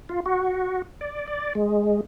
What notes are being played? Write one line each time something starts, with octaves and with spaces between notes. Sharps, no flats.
F4
F#4
D5
D5
G#3